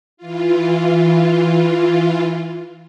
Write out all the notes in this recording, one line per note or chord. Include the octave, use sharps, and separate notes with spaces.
E3 F4